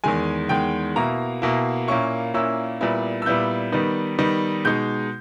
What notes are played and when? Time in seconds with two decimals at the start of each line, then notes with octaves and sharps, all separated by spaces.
0.04 E2 D#3 G#3 G#5
0.49 E2 D#3 G#3 G5
0.96 B2 A#3 E4 A#5
1.42 B2 A#3 E4
1.88 A#2 A#3 C#4 E4 C#6
2.34 A#2 A#3 C#4 E4 E6
2.81 A#2 G3 B3 E4
3.22 E6
3.26 A#2 G3 B3 E4 G6
3.72 D#3 G3 B3 D#4
4.19 D#3 G3 B3 D#4
4.65 B2 G#3 D#4 G6